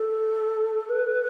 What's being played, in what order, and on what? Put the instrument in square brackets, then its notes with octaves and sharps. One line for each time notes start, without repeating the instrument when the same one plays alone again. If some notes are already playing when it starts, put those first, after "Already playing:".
Already playing: [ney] A4
B4